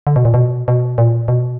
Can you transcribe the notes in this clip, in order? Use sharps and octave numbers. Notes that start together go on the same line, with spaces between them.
D3
B2
A#2
B2
B2
A#2
B2